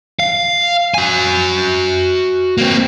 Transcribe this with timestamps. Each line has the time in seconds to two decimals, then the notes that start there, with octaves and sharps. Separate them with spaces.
0.19 F5
0.94 F#4 G#5
2.58 A#3 C4